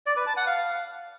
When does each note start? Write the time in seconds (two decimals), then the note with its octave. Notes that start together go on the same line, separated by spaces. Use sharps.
0.06 D5
0.16 B4
0.27 A5
0.37 F#5
0.47 F5